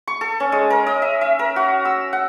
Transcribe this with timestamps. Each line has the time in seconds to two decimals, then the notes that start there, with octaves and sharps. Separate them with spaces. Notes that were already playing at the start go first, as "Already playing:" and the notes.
0.07 C#6
0.21 A4
0.40 C#4
0.52 G#3
0.70 A#4
0.87 D#5
1.02 E5
1.21 E5
1.39 A#4
1.56 F#4
1.85 E6
2.13 F#5